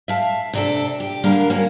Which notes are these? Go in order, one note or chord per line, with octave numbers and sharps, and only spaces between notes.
E5 F5 A5
C3 D4 A4
G4
D3 G3 A#3 A#4
A#3 C#4 F#4